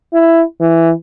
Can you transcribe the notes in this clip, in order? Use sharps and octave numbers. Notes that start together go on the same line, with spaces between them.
E4
E3